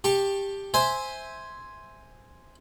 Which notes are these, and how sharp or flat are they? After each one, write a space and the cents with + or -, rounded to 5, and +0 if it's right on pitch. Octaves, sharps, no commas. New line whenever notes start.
G4 +10 A5 +0 C#6 -25
C5 +0 E5 -10 G#5 +0